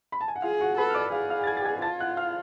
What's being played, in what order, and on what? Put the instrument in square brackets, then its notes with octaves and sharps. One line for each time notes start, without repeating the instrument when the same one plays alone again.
[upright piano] B5
A5
G#5
F#5
[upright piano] F4 F5 [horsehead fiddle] G#4
[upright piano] F#4 F#5
[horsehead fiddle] A4 [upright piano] B4 B5
[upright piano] F6
D5 D6
[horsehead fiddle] G#4 [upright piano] F5 F6
[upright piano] F5 F6
A6
G#5 G#6
A6
G#5 G#6
[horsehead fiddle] F4 [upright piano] A5 A6
[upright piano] F#5 F#6
F5 F6